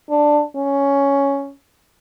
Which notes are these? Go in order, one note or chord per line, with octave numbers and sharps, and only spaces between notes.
D4
C#4